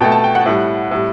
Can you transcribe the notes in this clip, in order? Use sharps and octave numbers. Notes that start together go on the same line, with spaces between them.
B2 A3 G5
A5
G5
F#5
A2 G3
A2 G3